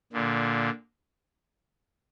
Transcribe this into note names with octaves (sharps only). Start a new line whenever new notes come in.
A#2 D3